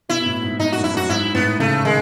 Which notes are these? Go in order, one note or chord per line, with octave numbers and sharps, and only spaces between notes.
B2 E4
B2
A2
G#2
A2 D#4
F#2 F#4
E4
F#2 F#4
G#2 E4
A2 B3
C#3 A3
D#3 G#3